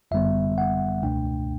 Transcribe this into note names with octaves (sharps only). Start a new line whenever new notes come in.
G1 F#2 D3 G3 B3 E5
F#5
C#2 B2 A3 D4 G5